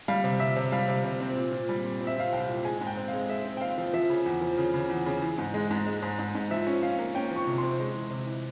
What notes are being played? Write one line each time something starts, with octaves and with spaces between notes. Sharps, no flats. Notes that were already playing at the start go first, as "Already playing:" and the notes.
G3 F5
C3
C3 E5
C3
G3 F5
C3
C3
C4
A#2
A#2
G3
A#2
C4
E5
C4 F5
C2 G5
A#2
G#3 G#5
G#2
G5
C4
F5
G#3
G#3 E5
C4
G5
C4 F5
F3
F3 E5
C#3
E2
F3
C#3
C#3
E2
C#3
E3
G#2
G#3
G#2
G#3
G#2
G#2
G#2
F3 E5
C#4
C#4 F5
A#3
C#4 G5
F3
C#6
C3
C6
C3
G#3
E3
C3
E3